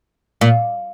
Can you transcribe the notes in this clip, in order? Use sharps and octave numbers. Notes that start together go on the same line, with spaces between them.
A#2